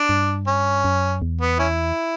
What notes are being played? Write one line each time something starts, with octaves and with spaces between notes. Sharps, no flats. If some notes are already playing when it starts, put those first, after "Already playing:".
Already playing: D4
G2
C#4
F#2
E2
B3
C#4 E4